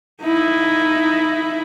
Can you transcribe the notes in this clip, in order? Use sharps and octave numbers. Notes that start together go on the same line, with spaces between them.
D#4 E4